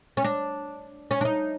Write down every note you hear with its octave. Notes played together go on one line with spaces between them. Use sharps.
C#4
D4
C#4
D4
D#4